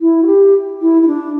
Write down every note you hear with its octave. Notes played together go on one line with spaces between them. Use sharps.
E4
F#4
G4
E4
E4
D4